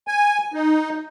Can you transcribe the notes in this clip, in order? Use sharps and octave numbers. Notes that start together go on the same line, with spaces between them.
G#5
D#4